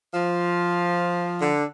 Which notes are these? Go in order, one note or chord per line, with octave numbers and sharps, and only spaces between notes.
F3
D3